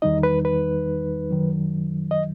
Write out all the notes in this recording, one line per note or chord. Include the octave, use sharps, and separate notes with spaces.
E2 D#3 G3 D#4 D#5
B4
B4
F#2 D#3 F#3
D#5